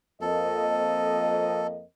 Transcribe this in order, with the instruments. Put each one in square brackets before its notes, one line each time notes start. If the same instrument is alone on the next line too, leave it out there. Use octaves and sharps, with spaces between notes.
[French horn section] F2 A#3 D#5 [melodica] A4